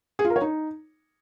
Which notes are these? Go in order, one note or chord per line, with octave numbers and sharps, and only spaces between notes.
G#4
F4
A#4
C#5
D#4